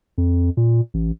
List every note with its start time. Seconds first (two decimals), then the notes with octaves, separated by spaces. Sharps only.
0.18 F2
0.57 A#2
0.94 A1